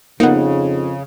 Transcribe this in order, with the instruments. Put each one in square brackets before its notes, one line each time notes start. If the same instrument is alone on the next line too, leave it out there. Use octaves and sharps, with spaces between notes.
[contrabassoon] F2 [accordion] C#3 [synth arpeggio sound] A#3 B3 [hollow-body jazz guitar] D#4 F#5